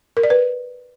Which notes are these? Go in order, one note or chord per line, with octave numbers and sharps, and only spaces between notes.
A#4
D5
B4